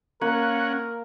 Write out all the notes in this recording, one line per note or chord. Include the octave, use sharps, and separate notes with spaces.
A#3 C#4 A#4 F#5